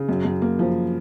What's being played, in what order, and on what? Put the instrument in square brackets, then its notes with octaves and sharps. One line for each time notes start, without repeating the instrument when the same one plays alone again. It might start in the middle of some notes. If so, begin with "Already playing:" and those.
Already playing: [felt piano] C#3
F#2
F#2
A#3
F3